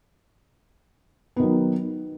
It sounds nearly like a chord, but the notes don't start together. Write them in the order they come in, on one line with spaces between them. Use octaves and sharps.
B3 D#3 F#3